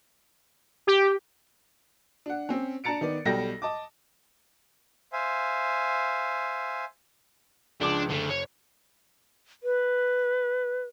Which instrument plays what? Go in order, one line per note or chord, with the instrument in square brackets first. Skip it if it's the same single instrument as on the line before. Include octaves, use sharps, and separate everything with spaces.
[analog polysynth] G4
[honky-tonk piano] D4 F#5
C4 C#4
D4 A5 A#5 A6 C#7 D7
D#3 B3 D5
B1 G3 A4 G5 A#6
D#5 A5 D6
[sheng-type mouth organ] C5 E5 F5 G#5
[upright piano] C#2 F3 D6 [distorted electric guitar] D4
[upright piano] F#1 [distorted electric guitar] D3 A3
[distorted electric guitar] C#5
[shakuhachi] B4